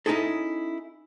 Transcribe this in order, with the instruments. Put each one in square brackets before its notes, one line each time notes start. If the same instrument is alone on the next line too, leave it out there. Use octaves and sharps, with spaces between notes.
[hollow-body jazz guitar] C#4 D#4 E4 G#4 A4